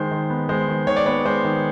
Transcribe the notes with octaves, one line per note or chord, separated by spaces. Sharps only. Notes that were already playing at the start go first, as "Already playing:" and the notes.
Already playing: D#3 G#3 C5
D#3
B3
G#3 C5
D#3
D#3 C#5
D5
B3 C#5
G#3 C5
D#3